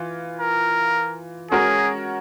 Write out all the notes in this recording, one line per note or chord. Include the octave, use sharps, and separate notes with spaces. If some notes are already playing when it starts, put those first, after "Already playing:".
Already playing: E3 F4
A#4
G#3 C#4 F#4 G#4 A#4 C#5